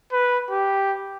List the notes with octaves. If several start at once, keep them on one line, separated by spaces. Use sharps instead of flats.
B4
G4